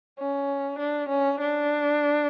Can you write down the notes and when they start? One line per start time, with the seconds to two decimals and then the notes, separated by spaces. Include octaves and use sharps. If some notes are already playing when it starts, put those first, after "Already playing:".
0.19 C#4
0.79 D4
1.09 C#4
1.40 D4